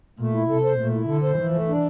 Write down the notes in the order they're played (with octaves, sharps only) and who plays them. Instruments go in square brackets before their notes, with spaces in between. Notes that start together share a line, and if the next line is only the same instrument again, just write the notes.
[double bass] A#2 [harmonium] A3
[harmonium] E4
[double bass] C3 [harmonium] A4
[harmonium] C5
[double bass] A#2 [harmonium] A3
[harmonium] E4
[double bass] D3 [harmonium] A4
[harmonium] C5
[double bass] E3 [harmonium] F3
[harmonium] A3
D4